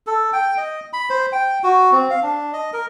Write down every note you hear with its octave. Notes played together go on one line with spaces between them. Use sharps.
A4
G5
D#5
B5
C5
G5
F#4
C4
F5
D4
D#5
A#4